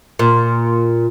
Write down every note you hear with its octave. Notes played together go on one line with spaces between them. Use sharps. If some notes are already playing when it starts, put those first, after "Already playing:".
A#2